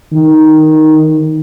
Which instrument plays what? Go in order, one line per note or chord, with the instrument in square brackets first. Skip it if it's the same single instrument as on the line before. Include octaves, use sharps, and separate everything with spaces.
[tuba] D#3